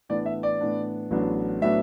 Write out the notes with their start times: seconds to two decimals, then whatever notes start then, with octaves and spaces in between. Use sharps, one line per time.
0.09 A2 E3 B3 D4 D5
0.26 E5
0.43 D5
0.61 A2 E3 B3 D4
1.11 A1 A2 F#3 B3 D4
1.62 A2 F#3 B3 D4 E5